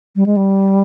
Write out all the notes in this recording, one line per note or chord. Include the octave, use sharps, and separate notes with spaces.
G3
G#3
G3